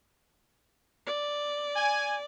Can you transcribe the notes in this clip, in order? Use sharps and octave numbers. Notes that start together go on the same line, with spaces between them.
D5
G#5